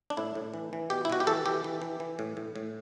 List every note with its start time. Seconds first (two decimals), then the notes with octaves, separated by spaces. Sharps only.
0.10 D4
0.17 A2 E4
0.35 A2
0.54 E3
0.73 E3
0.90 B2 G4
1.05 E4
1.10 B2 F#4
1.20 G4
1.27 E3 A4
1.46 E3 G4
1.64 E3
1.82 E3
2.00 E3
2.19 A2
2.37 A2
2.56 A2